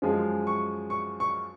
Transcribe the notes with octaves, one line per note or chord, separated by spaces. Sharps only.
F#2 F3 G#3
C#6
C#6
C#6